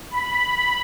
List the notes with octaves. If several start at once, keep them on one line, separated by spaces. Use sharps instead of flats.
B5